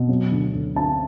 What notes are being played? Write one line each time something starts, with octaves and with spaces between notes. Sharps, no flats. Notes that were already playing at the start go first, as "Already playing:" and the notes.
Already playing: B2
F#3
D2
D2
D2 A5